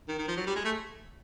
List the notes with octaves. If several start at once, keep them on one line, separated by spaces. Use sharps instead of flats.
D#3
D#3
F3
F#3
G3
G#3
A3